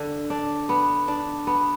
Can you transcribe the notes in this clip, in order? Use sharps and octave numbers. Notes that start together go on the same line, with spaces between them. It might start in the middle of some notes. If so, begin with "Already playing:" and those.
Already playing: D3 D4
D4
B3
D4
B3